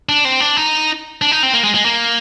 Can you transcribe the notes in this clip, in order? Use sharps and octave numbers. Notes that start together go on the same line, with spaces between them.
D4
C4
D4
D#4
D4
D#4
C4
A#3
G#3
G#3
A#3